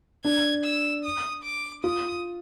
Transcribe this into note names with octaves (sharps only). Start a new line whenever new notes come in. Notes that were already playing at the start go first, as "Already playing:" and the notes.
D4 G#6
E6
D#6
D6
F4 D#6